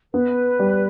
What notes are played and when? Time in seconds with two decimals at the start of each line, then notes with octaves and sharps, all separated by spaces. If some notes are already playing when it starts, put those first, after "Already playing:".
0.13 B3 B4
0.59 G3